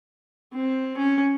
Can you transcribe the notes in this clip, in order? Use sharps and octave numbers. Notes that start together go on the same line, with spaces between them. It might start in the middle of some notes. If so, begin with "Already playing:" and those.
C4
C#4